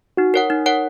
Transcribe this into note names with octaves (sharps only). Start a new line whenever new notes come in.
D#4 F#4
A#4 C#5 F#5
D#4
A#4 C#5 F#5